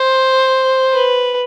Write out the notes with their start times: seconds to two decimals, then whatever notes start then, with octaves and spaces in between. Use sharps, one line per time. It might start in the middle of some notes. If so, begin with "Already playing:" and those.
Already playing: C5
0.93 B4